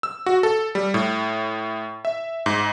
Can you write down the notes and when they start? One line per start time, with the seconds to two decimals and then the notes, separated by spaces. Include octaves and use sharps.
0.03 E6
0.26 F#4
0.43 A4
0.75 G3
0.94 A2
2.05 E5
2.46 G#2